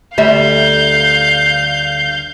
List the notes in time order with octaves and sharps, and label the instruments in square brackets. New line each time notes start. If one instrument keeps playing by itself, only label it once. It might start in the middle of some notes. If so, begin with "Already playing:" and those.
[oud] D2 G3 E5 [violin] F5 G6